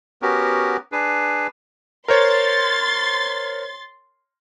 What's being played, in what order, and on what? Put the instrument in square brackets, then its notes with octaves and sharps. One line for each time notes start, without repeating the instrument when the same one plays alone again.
[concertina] B3 C#4 F#4 G4 A#4
D4 G#4 B4
[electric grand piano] A#4 C5 C#5 [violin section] C6 A6